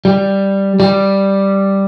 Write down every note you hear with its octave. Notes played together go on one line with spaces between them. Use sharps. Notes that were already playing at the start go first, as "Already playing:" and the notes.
G3
G3